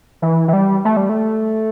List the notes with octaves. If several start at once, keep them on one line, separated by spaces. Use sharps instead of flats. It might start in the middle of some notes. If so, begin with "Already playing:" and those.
E3
E3
G3
A3
G3
A3